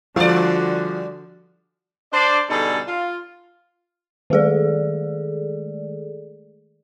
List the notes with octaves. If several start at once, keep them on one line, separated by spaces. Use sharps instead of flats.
D3 F3 G3 F#4 D5
D4 C5 D5
B2 D3 G3 D#4 G#4 A4
F4
D#3 G#3 A3 G#4 A4 D5